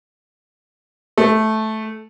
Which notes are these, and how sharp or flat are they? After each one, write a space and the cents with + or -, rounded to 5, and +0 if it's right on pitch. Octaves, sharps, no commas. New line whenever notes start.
A3 -10